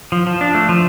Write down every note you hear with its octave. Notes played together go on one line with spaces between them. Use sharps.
F3
F3
D4
A3
F3